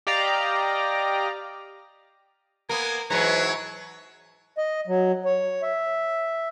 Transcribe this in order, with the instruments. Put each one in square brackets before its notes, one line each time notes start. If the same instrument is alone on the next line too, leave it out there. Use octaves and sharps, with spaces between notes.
[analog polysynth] G4 D5 D#5 F5 A#5
[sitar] A#3 B3 [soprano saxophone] A#4 [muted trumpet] G#5
[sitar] G#2 E3 F#3 [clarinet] B4 [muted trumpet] C#5 [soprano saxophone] A#5
[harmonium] D#5
F#3
C#5
E5